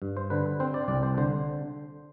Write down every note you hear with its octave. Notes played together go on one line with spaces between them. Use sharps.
G2
C5
D3 B4
C4 C5
D5
C2 D5
C5
D3 C5